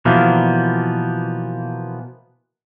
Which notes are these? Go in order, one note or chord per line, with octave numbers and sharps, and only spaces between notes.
B2 E3 F3 A#3 B3